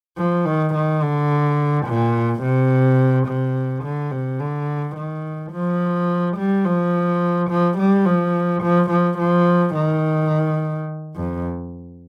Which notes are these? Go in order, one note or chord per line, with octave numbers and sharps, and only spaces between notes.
F3
D#3
D#3
D3
A#2
C3
C3
D3
C3
D3
D#3
F3
G3
F3
F3
G3
F3
F3
F3
F3
D#3
F2